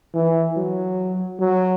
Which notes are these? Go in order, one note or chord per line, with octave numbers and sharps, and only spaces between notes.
E3
F#3
F#3